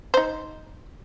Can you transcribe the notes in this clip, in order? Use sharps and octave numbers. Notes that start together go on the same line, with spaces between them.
D#4 C5